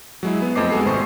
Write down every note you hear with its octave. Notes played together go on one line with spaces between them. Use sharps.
F#3 G#3 E4
B3
F2 A3 C5 D#5 D6 C7
G#3 B3 F#4 G#4 A4
G#1 C3 C5 C#6 C7